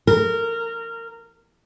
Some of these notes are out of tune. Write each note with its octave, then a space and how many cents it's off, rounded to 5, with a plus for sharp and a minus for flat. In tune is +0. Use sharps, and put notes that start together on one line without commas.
A#4 -20